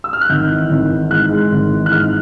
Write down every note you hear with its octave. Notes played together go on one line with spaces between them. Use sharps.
E6
F6
F#6
G#1 G6
E3
G#1
E3
G#2 F#6
G#3
G#1
E3
F#6
G#2 F6